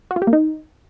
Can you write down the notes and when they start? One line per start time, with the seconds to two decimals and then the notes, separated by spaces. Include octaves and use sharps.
0.11 F#4
0.16 F4
0.22 G4
0.27 A#3
0.33 D#4